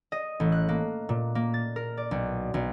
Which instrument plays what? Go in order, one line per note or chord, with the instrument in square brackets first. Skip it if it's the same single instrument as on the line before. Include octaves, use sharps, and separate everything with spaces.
[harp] D#5
A1
F#6
A#3
A#2
A#3
A6
A#4
D5
B1
B1